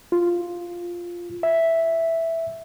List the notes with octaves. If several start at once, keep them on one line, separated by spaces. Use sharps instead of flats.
F4
E5